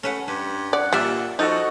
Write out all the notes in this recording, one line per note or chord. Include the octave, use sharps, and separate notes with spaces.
A3 C#4 B4 F#5
G2 B4
D5 F#5
A#2 G3 F4 D5 E5
F3 D#4 F#4 A4 D#5